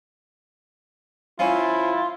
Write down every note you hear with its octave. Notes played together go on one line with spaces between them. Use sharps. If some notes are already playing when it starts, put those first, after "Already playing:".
F3 C#4 E4 F4